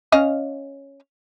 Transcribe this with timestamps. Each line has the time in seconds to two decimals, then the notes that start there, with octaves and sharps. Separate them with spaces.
0.12 C#4 D#5 F5